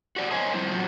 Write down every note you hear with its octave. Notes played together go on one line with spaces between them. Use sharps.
F#4 G4 C#5 D5
A#4 C5 C#5 D#5 G#5
F3 G3 C4 E4 C5
A2 F#3 C4 F4 F#4